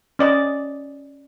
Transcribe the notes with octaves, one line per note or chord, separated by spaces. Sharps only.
C#4 D5 D#5